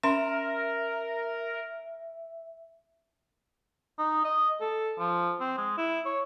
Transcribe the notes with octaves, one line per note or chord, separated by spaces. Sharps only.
C#4 A#4 E5 B5 C6
D#4
D#5
A4
F3
C4
G#3
E4
C#5